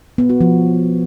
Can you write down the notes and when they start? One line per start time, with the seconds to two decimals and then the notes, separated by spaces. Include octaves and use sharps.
0.18 B3
0.29 F#4
0.41 F3